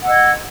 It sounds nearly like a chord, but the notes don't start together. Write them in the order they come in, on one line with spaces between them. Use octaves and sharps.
F#5 E6 D#5 G#6